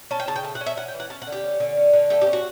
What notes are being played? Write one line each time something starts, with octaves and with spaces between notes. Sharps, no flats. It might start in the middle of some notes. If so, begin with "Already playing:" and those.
C#4 A5
G5
C#3 A5
G5
A3 A5
F#5
C#4
E5
C#4 F#5
G5
E3
F#5
C#4 A5
F#5
D3
G4
C#4
D3
C#4
D3
A3 G4
G4
C#4
F#4